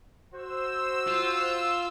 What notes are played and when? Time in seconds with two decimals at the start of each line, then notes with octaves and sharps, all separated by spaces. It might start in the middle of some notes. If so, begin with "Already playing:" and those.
0.33 F#4 C5 E6
1.08 F4